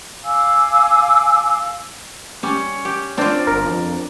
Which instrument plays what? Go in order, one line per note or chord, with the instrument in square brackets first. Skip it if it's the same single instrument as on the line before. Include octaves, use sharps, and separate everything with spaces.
[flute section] F5 G#5 D6 E6
[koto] G3 [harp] C#4
[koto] G4
[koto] C4 F4 [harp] D4 [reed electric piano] C5 D5
[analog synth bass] G1 [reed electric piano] A#4
[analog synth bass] F2